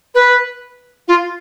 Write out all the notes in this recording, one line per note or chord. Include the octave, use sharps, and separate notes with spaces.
B4
F4